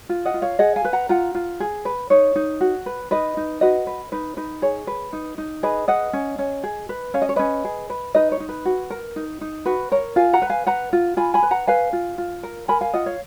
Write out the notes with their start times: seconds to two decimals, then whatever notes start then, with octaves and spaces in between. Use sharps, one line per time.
0.09 F4
0.25 D#5 F#5
0.34 F4
0.42 C#5 F5
0.59 G#4 D#5 F#5
0.76 F5 G#5
0.85 B4
0.93 F#5 A#5
1.09 F4 F#5 A#5
1.35 F4
1.60 G#4
1.85 B4
2.10 D#4 C#5
2.36 D#4
2.61 F#4
2.86 B4
3.11 D#4 B4 D#5
3.37 D#4
3.61 F#4 B4 D#5
3.87 B4
4.12 D#4 B4
4.37 D#4 B4
4.62 G#4 C#5
4.87 B4
5.13 D#4
5.38 D#4
5.63 G#4 B4 D#5
5.88 B4 D#5 F#5
6.13 C#4
6.38 C#4
6.63 G#4
6.89 B4
7.14 C#4 F5
7.22 D#5
7.29 C#5
7.36 C#4 B4 D#5
7.64 G#4
7.90 B4
8.15 D#4 B4 D#5
8.32 C#5
8.40 D#4
8.49 B4
8.65 F#4
8.90 A#4
9.16 D#4
9.41 D#4
9.66 F#4 B4
9.92 A#4 C#5
10.16 F4 F5 G#5
10.33 F#5 A#5
10.42 B4
10.50 F5 G#5
10.66 B4 F#5 A#5
10.93 F4
11.17 F4 G#5 B5
11.34 G#5 B5
11.43 B4
11.51 F#5 A#5
11.67 B4 F5 G#5
11.93 F4
12.18 F4
12.43 A#4
12.68 A#4 G#5 B5
12.81 F5 G#5
12.94 F4 D#5 F#5
13.06 C#5 F5